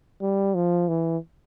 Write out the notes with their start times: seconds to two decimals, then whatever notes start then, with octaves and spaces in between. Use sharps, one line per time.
0.22 G3
0.55 F3
0.88 E3